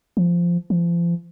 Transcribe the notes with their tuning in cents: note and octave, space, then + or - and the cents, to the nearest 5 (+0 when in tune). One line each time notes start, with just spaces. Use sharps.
F3 -10
F3 -35